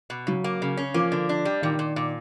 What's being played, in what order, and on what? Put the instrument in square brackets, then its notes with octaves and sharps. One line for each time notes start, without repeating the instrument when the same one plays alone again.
[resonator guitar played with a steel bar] B2
[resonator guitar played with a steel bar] C#3 [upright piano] F#3
[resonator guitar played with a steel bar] A#3
C#3
C#4
[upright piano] F3 [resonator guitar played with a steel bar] A#3
[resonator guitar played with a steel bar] D3
D4
G3
[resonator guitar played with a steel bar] A#2 [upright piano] D#3
[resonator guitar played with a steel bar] A#2
A#2